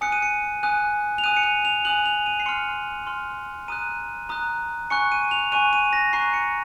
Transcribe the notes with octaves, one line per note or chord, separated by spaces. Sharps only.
G#5 D#6 F#6 C#7
D#7
C#7
G#5 D#6 F#6
F7
G#5 D#6 F#6 D#7
C#7
D#7
F7
G#5 D#6 F#6 F#7
F7
D#7
C7
C6 F6 C#7
C6 F6
A#5 D#6 F#6 D#7
A#5 D#6 F#6
G#5 C#6 F#6 C#7
D#7
F7
G#5 C#6 F#6 D#7
D#7
A#6
A#5 C#6 F#6 C7
C#7